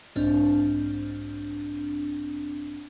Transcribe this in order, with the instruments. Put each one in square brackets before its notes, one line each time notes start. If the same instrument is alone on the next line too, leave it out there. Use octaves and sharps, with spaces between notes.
[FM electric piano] B1 G#2 C4 D4 F6